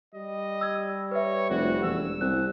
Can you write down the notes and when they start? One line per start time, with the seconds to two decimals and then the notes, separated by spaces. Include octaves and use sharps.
0.14 G3 D#5
0.61 E6 G#6
1.11 B4 C#5 E5
1.50 F1 F#4
1.83 E1 E6
2.21 C2 F#6